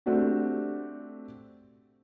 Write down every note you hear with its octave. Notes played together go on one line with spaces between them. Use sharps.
A3 C4 D4 F#4 G4